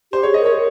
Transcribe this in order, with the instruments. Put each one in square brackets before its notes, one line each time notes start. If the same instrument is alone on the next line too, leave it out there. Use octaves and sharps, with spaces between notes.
[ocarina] G4 [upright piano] C5
[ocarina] G#4 [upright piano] C#5
[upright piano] D#5
[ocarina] A#4
[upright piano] C#5